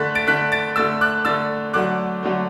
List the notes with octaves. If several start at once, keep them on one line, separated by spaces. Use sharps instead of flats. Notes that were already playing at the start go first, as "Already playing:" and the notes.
Already playing: D3 A3 F#6 A6 B6
A6 D7
D3 A3 F#6 B6
A6 D7
D3 A3 E6 A6
D6 F#6
D3 A3 E6 A6
D3 F#3 A3 D6 F#6
D3 F#3 A3